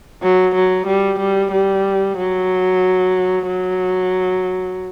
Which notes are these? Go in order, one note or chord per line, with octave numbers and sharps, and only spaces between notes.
F#3
F#3
G3
G3
G3
F#3
F#3